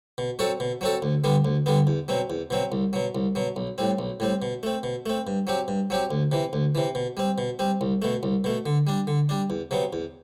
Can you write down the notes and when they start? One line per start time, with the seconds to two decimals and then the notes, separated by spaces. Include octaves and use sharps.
0.18 B2
0.39 F#3 C4 F#4 A4
0.60 B2
0.81 F#3 C4 F#4 A4
1.02 D2
1.24 D3 G3 B3
1.45 D2
1.66 D3 G3 B3
1.87 E2
2.08 B2 F#3 C4
2.30 E2
2.50 B2 F#3 C4
2.72 C2
2.93 B2 F#3
3.15 C2
3.35 B2 F#3
3.56 B1
3.78 A2 G3 C4
3.99 B1
4.20 A2 G3 C4
4.42 B2
4.63 A3 C4
4.83 B2
5.06 A3 C4
5.27 G2
5.47 F#3 C4 G4
5.68 G2
5.90 F#3 C4 G4
6.11 D2
6.32 C3 E3
6.53 D2
6.75 C3 E3
6.95 B2
7.17 G3 C4
7.38 B2
7.59 G3 C4
7.81 C2
8.02 B2 A3
8.23 C2
8.44 B2 A3
8.66 D3
8.87 G3 D4
9.07 D3
9.29 G3 D4
9.50 E2
9.71 C3 F#3 B3
9.93 E2